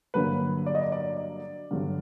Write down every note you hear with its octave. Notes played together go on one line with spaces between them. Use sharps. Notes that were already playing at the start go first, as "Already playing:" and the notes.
G2 D3 F#3 A#3 B4
D5
D#5
D5
D5
G2 D3 F#3